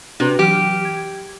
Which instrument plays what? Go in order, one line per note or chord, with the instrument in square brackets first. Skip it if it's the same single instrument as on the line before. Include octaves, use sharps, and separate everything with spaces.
[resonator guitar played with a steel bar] C3 [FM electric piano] D4 F#4 B4
[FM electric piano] E3 F#3 F6 [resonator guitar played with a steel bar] G4
[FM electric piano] G#6